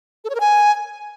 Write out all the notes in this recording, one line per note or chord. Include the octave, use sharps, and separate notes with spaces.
A4
C#5
A#4
G#5